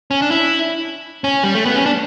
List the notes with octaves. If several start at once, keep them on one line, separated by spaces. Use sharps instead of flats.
C#4
D4
E4
C#4
G3
A3
B3
C#4
D4